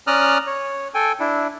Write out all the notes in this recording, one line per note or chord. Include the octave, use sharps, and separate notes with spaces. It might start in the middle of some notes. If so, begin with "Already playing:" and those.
C#4 D5 A#5 D#6 F6 F#6
C#5
A4 G5 G#5
D4 E4